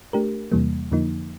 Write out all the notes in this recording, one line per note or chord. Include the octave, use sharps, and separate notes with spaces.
A3 D4 G4 A#4
E2 C3 E3 G3 A#3
F2 D3 F3 A#3 D#4